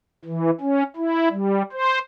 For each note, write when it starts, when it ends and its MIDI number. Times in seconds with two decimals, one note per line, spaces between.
0.25 0.50 52
0.61 0.83 61
0.96 1.29 64
1.30 1.63 55
1.72 1.99 72